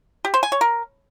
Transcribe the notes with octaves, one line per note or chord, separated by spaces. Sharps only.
G4
C5
G#5
C#5
A#4